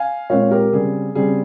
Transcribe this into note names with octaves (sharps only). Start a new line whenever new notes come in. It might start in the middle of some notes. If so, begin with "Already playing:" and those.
Already playing: F5 G#5
A#2 G#3 C4 C#5 F5
G4 A#4
C#3 G3 C4 G#4
C#3 G3 C4 G#4